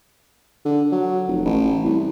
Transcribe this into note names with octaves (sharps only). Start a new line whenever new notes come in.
D3
F#3
F1
A1
C2